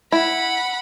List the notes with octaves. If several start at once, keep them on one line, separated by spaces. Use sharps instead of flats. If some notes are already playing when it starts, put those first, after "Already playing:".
E4 F#5 B5